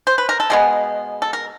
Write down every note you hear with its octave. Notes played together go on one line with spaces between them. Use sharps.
C5
B4
A#4
A4
B2 G#3 B3 G#4
A4
A#4